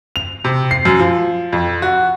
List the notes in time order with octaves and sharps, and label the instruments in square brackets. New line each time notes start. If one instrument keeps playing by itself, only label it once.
[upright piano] F7
C3
C7
F#2
F3
F2
F#4